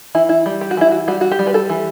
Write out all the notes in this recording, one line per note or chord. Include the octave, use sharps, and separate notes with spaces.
E3 E4
E4
G3
G4
F#4
E3 E4
F#4
G3 F#4
F#4
G4
G3
B4
A4
E3